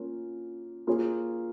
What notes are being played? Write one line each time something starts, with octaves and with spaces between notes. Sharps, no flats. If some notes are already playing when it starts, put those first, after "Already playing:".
Already playing: A#3 C#4 F4 A#4
A#3 F4 G#4 C#5